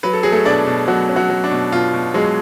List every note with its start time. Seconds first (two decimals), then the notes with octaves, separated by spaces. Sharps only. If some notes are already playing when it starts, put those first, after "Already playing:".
0.03 F#3 B4
0.13 A4
0.23 F#3 G#4
0.32 A3 A4
0.45 B2 D4 D5
0.67 B2
0.87 B2 F#3 F#4
1.09 C#4
1.16 F#3 F#4
1.30 F#3
1.44 D4
1.51 B2
1.72 B2 F4
1.94 B2
2.14 F#3 G#3 G#4